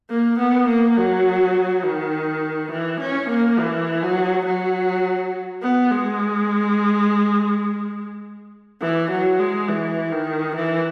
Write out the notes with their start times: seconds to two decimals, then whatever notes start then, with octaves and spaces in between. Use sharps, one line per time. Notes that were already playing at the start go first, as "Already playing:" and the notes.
0.10 A#3
0.39 B3
0.68 A#3
0.98 F#3
1.84 D#3
2.72 E3
3.01 C#4
3.30 A#3
3.58 E3
4.03 F#3
4.46 F#3
5.63 B3
5.91 G#3
8.81 E3
9.11 F#3
9.39 G#3
9.68 E3
10.12 D#3
10.56 E3